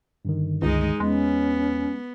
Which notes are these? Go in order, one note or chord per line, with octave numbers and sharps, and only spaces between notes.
G2 D3 D#3
C#2 G#3 D#4
E2 G#3 B3 C#4